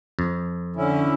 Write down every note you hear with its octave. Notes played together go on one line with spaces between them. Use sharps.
F2
D3 C#4 E4